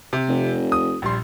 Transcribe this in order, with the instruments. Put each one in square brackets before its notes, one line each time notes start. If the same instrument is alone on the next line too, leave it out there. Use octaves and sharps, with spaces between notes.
[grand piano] C3
[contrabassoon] F1
[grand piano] D#6
A#1 G3 C6